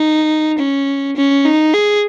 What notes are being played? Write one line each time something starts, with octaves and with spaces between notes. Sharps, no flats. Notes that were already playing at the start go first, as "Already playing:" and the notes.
Already playing: D#4
C#4
C#4
D#4
G#4